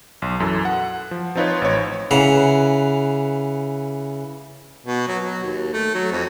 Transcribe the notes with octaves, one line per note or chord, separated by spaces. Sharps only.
B1
F#2 E3 A4
F#5
F3
F3 C4 D#4 F4 B4 C#5
A1 C#5
C#3 E3 F#5 A#5
B2
F#3
F#3
D#2
A3
F#3
F2